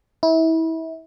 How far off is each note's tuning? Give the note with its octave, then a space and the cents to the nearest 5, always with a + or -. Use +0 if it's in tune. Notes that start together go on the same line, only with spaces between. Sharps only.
E4 -30